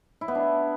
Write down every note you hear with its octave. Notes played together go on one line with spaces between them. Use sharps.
E4
B3
D4